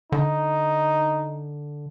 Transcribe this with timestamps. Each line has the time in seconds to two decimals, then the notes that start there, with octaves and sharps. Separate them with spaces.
0.12 D3 D#4